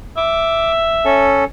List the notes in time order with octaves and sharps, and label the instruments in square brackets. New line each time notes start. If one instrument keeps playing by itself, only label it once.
[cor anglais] E5 [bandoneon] D6
[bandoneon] C#4 A4